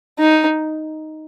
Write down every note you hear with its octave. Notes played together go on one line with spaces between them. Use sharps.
D#4